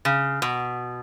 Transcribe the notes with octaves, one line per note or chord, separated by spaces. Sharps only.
C#3
B2